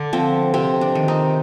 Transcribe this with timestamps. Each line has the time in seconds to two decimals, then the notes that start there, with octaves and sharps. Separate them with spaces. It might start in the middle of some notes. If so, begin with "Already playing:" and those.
Already playing: D3 D4
0.13 F3 C4
0.54 C3 C4
0.81 D4
0.95 D#3
1.08 C4 D#4